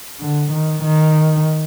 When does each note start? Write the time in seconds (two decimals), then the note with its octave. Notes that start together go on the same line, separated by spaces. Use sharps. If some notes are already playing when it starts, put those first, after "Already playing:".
0.20 D3
0.52 D#3
0.83 D#3